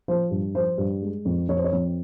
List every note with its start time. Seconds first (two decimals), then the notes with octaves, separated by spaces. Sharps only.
0.08 F3 C5
0.31 G2
0.55 F3 C5
0.78 G2
1.02 G#3
1.25 F2
1.48 F2 C#5
1.57 C5
1.64 C#5
1.72 F2